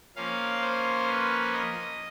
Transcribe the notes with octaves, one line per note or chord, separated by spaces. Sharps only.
F3 A#3 C#4 F5
C5
B4
D#5